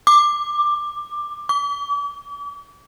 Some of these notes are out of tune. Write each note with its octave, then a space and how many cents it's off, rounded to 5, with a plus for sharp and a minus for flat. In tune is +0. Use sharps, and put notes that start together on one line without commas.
D6 +15
D6 -40